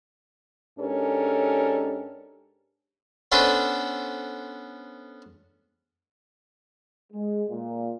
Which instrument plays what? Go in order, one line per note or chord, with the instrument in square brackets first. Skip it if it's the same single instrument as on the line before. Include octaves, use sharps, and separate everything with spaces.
[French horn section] G#2 C#4 D4 G4 A4 A#4
[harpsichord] B3 C#4 D4 A4 B4 C5
[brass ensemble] G#3
A#2